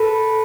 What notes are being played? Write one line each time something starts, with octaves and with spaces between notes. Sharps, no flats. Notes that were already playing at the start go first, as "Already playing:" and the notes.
Already playing: A4 B4